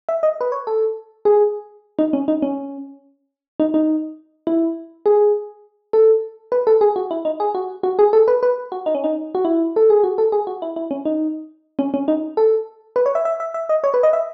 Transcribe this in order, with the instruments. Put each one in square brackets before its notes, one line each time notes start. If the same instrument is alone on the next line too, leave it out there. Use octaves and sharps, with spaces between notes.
[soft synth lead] E5
D#5
B4
C#5
A4
G#4
D#4
C#4
D#4
C#4
D#4
D#4
E4
G#4
A4
B4
A4
G#4
F#4
E4
D#4
G#4
F#4
F#4
G#4
A4
B4
B4
F#4
D#4
C#4
D#4
F#4
E4
A4
G#4
F#4
A4
G#4
F#4
E4
E4
C#4
D#4
C#4
C#4
D#4
A4
B4
C#5
E5
E5
E5
E5
D#5
C#5
B4
D#5
E5